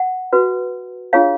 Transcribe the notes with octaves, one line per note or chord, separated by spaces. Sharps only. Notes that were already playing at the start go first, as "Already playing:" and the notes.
Already playing: F#5
F#4 B4
D4 F4 G#4 C#5 F5